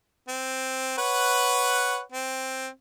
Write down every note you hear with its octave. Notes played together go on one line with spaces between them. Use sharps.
C4
B4 C#5 F#5
C4